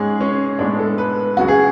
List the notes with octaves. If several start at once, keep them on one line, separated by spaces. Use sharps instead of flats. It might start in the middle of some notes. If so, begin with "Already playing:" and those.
Already playing: G#2 G#3 C#4 G#4
C#4
A2 G#3 B3 D4
A4
B4
C#2 C#3 F#3 F#4
G#4